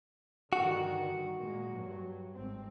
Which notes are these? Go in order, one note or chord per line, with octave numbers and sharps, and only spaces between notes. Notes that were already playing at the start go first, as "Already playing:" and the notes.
G2 D3 D#3 F#4
A#2 G#3 A#3
G2 F#3
G#1 C4